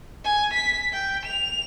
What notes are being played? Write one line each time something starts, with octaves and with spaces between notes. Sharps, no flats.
G#5
B6
G5
F7